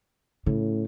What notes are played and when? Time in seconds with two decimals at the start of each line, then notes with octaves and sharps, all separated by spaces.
0.46 A2 C#3